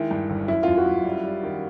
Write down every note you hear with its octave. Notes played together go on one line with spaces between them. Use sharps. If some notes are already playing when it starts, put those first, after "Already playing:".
Already playing: D#3 G#3 E4
G2
G1
F#2 E4
F#2 F4
F#4
F#2
G3
G3
D#3